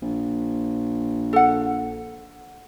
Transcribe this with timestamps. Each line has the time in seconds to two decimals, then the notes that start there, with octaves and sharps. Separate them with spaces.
0.02 A#1
1.33 A4 F#5